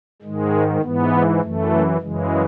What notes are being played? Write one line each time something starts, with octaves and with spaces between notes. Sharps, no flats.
G#2 D#3 G#3
G#2 E3 B3
F#2 E3 A3
F#2 C#3 E3 G#3